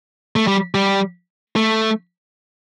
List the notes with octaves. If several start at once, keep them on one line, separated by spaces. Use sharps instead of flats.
A3
G3
G3
A3